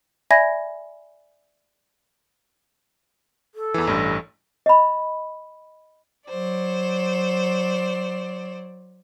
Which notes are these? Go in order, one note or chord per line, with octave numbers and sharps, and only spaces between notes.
D5 E5 G#5 B5 G#6 A#6
A4
E2 E3
A1 G2
D#5 B5
F#3 C5 D5